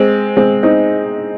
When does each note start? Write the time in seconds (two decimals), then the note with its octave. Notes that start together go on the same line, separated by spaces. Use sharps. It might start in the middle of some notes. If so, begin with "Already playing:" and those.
Already playing: G#3 C4
0.37 G#3 C4
0.63 C4 D#4